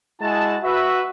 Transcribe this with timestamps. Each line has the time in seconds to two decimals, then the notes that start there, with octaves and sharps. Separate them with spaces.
0.21 G#3 E4 F#4 G#4 A5
0.64 F#4 B4 E5